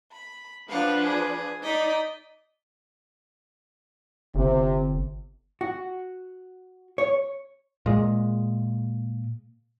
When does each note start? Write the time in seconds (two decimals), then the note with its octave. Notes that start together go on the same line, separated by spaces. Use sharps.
0.13 B5
0.69 F3 D4 B4 F5 F#5
1.01 G#4
1.63 D#4 D5 D#5 B6
4.35 G1 C3
5.61 F#4
6.98 C#5
7.86 A#2 G#3